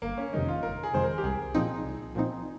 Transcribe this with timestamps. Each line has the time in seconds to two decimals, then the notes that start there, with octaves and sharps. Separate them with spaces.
0.02 G1 A#3
0.18 C#4
0.33 F2 C3 D#3 G#3 D#4
0.48 F4
0.63 G1 A#4
0.83 G#4
0.93 F2 C3 D#3 G#3 C5
1.04 A#4
1.18 G4
1.24 C2 G#4
1.55 A#2 F3 C4 D#4
1.84 C2
2.15 A#2 F3 C4 D#4